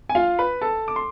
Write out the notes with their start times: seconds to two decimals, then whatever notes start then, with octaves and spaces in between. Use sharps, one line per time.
0.09 G#5
0.15 F4 F5
0.39 B4 B5
0.61 A4 A5
0.88 D6
0.96 C6